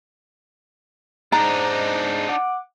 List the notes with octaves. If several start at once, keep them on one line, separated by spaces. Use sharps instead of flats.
G#2 D4 D#4 A#5
F#5 D6